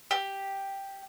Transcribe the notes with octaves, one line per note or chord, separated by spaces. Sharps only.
G4